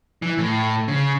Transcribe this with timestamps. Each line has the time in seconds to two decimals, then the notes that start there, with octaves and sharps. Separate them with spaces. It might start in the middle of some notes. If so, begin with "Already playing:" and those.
0.22 E3
0.38 A2
0.88 C#3